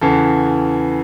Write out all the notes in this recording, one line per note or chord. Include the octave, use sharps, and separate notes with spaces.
E2 C#3 E3 A4